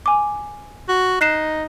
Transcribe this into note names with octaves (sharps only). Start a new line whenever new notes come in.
G#5 D6
F#4
D#4 F#6 C7 E7